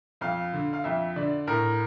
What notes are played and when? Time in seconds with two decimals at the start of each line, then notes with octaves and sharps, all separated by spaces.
0.21 F2 F5
0.53 D3
0.73 F5
0.84 F2 E5
1.16 D3 D5
1.47 A2 A#4